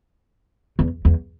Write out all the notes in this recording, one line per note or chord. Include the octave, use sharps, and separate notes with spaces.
E2
E2